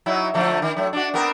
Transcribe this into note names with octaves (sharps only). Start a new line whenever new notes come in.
F#3 D#4 E4
D3 F3 A3
D#3
F#3 A3
D4 F#4
B3 C4 A#4